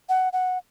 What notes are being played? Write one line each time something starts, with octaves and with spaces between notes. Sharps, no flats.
F#5
F#5